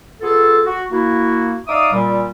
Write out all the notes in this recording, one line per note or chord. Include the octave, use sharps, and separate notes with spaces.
B3 F4 G#4 A4
F#4
A#3 E4 F#4
D#4 D5 E5 F5 D6 D#6
A#2 G3